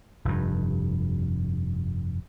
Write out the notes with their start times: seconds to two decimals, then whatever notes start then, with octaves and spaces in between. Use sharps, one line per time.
0.25 F1 G2